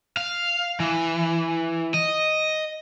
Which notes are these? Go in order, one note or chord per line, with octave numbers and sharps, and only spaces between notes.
F5
E3
D#5